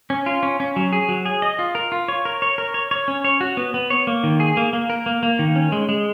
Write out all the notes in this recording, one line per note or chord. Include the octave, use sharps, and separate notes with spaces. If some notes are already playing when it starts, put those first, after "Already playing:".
C#4
F4
C#4
C#4
F#3
G#4
F#3
G#4
D#5
F4
A#4
F4
C#5
A#4
C#5
A#4
C#5
C#5
C#4
C#5
F#4
B3
B3
C#5
A#3
D#3
G#4
A#3
A#3
A#4
A#3
A#3
D#3
C#4
G#3
G#3